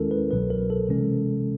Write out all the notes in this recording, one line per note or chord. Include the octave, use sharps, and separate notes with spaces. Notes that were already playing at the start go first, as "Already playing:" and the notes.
Already playing: D#2 D#3 G#3 C#4 E4 A4 A#4
B4
C2 B2 F#3 B4
A#4
A4
C3 E3 G#3 C#4